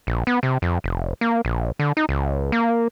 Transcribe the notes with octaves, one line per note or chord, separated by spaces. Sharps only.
A#1
B3
C3
F2
F1
A#3
A#1
D3
D#4
C#2
A#3